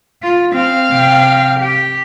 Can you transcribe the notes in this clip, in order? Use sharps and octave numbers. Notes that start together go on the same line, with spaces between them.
F4
C4 F5
C3 G5
G4